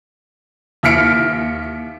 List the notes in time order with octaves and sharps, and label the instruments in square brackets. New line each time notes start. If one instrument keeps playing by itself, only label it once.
[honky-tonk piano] D#2 E5 F6 B6 C#7 D7